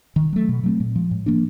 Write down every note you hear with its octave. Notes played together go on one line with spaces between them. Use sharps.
D#3
F#3 A3
B2
F#3 A3 C4
A#2
F3 G#3
A2
F3 A#3 D4